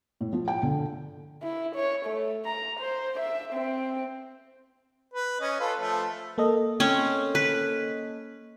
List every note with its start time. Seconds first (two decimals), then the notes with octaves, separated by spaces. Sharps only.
0.21 A2
0.33 F3
0.48 G5
0.63 D3
1.43 E4
1.75 C#5
2.06 A3
2.45 A#5
2.80 C5
3.19 E5
3.53 C4
5.14 B4
5.41 C#4 D#5
5.60 F4 A4 B4
5.80 F3 A3
6.38 A#3 A4 D#5
6.80 C4 C#4
7.35 B4